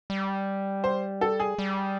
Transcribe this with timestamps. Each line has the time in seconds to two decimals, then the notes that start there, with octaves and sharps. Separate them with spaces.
0.10 G3
0.84 C5
1.21 A4
1.40 G#4
1.59 G3